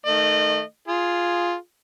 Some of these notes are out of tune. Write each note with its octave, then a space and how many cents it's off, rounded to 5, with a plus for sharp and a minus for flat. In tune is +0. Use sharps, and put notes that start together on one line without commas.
D#3 +0 A3 +0 D#5 -35
F4 +0 G#4 +5